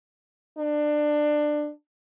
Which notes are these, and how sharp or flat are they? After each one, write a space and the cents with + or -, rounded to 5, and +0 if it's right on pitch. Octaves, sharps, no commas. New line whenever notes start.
D4 +20